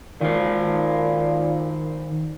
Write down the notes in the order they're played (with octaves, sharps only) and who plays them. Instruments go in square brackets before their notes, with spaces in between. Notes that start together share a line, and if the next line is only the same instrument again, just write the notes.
[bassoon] A#2 [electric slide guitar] D#3 C5